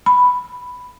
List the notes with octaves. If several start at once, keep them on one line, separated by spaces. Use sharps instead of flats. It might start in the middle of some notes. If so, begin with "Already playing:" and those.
B5